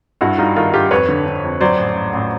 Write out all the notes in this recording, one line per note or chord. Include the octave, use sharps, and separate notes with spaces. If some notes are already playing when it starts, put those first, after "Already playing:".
G2 E4 F#4
G3 D#4 F4
D#3 D#4 F4
G2 F4 G4
F2 B4 C#5
D3
D3
F2
F#3 C5 D5
A1
A1
A1